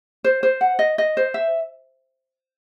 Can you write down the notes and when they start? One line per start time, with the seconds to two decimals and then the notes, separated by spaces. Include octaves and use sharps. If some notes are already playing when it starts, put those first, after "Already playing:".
0.24 C5
0.43 C5
0.61 F#5
0.79 D#5
0.98 D#5
1.17 C5
1.34 E5